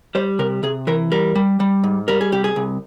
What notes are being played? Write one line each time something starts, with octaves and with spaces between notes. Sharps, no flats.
G3 C5
C3 A#4
C3 G#4
E3 A#4
G3 A#4
G3
G3
G#2
G3 A#4
G#4
C2 G4
G#4
C2